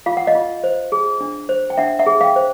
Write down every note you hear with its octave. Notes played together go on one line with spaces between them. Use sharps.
F4 F5
F#5
D#5 F5
F4
C5
G#4
D4
C5
G5
D4 E5 F#5
E5 F#5
G#4
F5 G5
C5